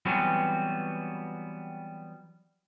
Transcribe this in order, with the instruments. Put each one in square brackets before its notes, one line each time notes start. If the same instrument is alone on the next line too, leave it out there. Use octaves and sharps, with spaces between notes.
[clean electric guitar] E3 F#3 G3 B3 C4 F#4